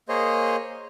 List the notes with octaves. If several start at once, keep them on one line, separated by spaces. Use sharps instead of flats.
A#3 G#4 C5 C#5 D#5